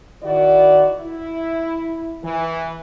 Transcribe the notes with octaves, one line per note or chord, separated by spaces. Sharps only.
D#3 E4 F#4 D5
E4
E3